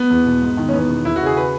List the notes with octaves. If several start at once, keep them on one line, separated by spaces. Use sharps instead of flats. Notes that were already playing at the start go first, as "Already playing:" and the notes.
Already playing: B3
E2
B2
G#2
D#3
C#4
E2 B3
B2
E2 E4
F#4
C#3
G#4
B4